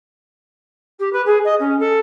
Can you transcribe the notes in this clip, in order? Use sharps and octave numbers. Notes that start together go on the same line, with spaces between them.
G4
B4
G#4
D#5
C#4
A4